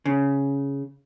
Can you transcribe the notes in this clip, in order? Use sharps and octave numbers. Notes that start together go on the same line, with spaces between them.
C#3